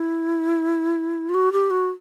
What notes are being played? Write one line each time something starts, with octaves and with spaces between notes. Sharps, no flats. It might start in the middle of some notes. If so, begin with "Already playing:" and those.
Already playing: E4
F4
F#4
G4
F#4